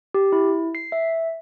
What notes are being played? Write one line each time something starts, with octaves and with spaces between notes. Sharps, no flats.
G4
E4
C7
E5